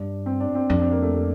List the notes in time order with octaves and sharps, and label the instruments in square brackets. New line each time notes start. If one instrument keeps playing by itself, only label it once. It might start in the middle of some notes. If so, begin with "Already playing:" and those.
Already playing: [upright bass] G2 [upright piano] D4
[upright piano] C4
D4
C4
[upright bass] F2 [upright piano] D4
[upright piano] C4
A#3
A3
A3